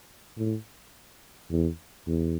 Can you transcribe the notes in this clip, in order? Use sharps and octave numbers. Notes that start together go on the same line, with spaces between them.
A2
E2
E2